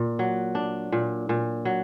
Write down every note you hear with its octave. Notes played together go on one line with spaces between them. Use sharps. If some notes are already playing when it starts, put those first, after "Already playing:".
Already playing: A#2
F#3
D4
A#2
A#2
F#3